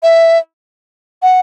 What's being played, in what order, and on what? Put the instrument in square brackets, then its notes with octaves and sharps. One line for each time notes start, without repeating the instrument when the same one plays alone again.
[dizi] E5
F#5